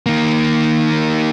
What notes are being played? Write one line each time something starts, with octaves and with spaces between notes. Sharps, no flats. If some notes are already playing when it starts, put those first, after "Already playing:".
D#3 A#3